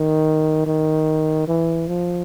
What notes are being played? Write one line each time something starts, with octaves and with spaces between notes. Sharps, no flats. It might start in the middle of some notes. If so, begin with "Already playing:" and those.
Already playing: D#3
D#3
E3
F3